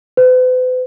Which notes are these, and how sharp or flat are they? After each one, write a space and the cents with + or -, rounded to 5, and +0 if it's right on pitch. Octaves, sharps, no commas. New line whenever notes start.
B4 +45